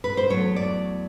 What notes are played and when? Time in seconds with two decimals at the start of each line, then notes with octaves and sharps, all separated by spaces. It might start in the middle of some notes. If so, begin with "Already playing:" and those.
0.04 B4
0.17 C5
0.30 E2 B2 F#3 A3 C#5
0.56 D5